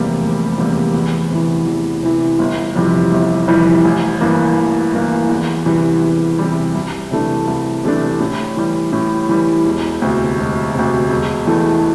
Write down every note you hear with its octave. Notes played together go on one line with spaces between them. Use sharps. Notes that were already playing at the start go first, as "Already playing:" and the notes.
Already playing: F1 E2 C3 G3 A#3
F1
E2 C3 G3 A#3
E2
C3 E3
E2
C3 E3
G1
F2 C3 E3 G3
G1
F2 C3 E3 G3
A1
G2 E3 A#3
A1
G2 E3 A#3
E2
C3 E3 G3
E2
C3 E3 G3
C2
C3 E3 A3 D4
C2
C3 E3 A3 D4
A2
E3 G3
A2
E3 G3
E1
D2 C3
E1
D2 C3
E1
E2 E3 A3